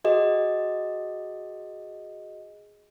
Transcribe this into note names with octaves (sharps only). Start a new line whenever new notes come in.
F#4 G#4 D#5